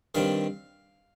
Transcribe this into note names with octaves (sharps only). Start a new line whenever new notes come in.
G2 D#3 G3 C4 F5